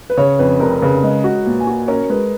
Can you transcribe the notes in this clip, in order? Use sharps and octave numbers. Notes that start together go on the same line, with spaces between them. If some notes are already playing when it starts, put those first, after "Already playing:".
B4
C#3 C#5
F2 B4
F1 A#4
C#3 B4
G#3 D#5
F#4
A#2
G#5
F#4
C#4 A#4
G#3 B4